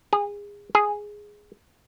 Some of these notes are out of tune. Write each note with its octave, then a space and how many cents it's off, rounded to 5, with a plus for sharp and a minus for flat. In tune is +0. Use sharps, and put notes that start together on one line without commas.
G#4 -25
G#4 +0